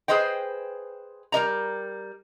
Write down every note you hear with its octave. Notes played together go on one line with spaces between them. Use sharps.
G#4 B4 C5 D#5 G5
G3 A#4 D#5 A#5